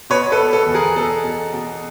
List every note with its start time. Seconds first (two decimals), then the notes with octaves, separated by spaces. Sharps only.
0.10 B2 B4 C#5
0.32 A4 B4
0.39 B2
0.53 A4
0.67 E2
0.74 G#4 A#4
0.96 B2 A4
1.24 B2
1.53 B2